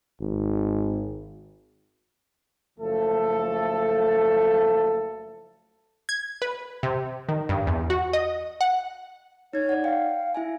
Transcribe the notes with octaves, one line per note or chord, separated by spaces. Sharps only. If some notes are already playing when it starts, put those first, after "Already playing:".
G#1
F#1 F3 A3 A4
G#6
B4
C3
D#3
G2
E2
F#4
D#5
F#5
D#4 C#5 G#6
D5 F#5
F5 G5
E4 E5 G#5